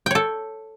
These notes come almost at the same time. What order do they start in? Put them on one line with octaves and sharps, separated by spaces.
G5 C#5 A4